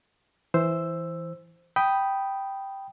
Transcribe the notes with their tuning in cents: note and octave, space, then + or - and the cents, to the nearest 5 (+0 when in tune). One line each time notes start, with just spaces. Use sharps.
E3 +0 C5 +0 E6 +5
G5 -5 B5 +0 D#6 +0